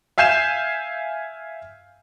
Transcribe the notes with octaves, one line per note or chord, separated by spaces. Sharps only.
E5 F5 G#5 G6 C7 E7